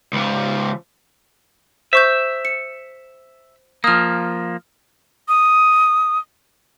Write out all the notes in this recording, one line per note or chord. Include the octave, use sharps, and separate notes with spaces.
C#2 F3
C5 E5 C#6 G6
C#7
F3 A#3 D#6 F6
D#6